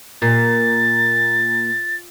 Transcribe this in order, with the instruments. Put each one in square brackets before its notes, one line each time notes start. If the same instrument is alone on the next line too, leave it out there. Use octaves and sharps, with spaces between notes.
[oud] A#2 [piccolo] A6